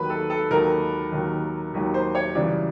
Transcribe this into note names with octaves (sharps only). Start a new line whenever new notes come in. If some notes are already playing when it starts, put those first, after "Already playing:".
Already playing: D#2 D#3 F#3 B4
A4
A4
D#2 D#3 F#3 A#4
D#2 D#3 F#3
D#2 D#3 F#3
C5
C#5
F#2 C#3 E3 G3 D5